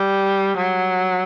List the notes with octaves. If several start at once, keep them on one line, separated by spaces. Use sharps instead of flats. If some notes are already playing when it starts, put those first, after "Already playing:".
Already playing: G3
F#3